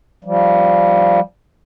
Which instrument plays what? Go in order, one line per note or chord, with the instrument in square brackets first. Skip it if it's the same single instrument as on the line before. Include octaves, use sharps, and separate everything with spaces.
[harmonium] F3 G3